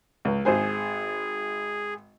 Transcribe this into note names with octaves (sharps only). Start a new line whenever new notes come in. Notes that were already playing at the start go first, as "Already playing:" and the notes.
C#2
G#1 G#4 C5 G#5